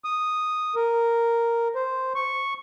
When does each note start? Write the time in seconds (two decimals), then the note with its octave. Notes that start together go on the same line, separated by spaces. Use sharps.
0.04 D#6
0.75 A#4
1.75 C5
2.16 C#6